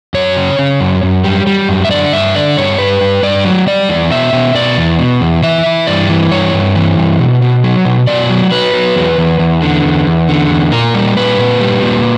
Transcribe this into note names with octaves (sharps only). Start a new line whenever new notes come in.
F#2 C#5
C#3
C#3
F#2
F#2
G3
G3
F#2
E5
D3 D5
G2 E5
D3 D5
G2 C#5
G2 B4
G2
G2 D5
F#3
G3 D5
E2
B2 E5
B2
B2 D5
E2
B2
E2
E3 E5
E3
G2 D5
E3
G2 C#5
G2
E3
G2
B2
B2
F#3
B2
B2 D5
F#3
F#3 B4
F#3
E2
E2
E2
D3
E2
E2
D3
E2
A#2 A#4
G3
A#2 B4
A#2
G3
A#2